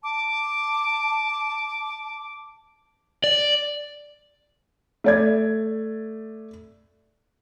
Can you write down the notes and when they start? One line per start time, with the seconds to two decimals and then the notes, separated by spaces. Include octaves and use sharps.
0.03 A5 D6
3.24 D5
5.04 A3 D5 G#6